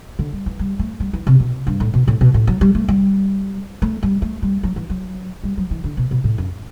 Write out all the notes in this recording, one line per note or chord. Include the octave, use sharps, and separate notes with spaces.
D3
G3
E3
G3
A3
G3
E3
C3
B2
G2
A2
B2
A2
B2
A2
F#3
G3
A3
G3
A3
G3
A3
G3
F#3
E3
F#3
G3
F#3
E3
D3
B2
B2
A2
F#2